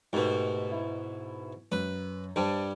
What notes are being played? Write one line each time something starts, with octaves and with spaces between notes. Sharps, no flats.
G#2 B2 A3 G4 A#4
E4
F#2 B4
G2 G3 C5 A5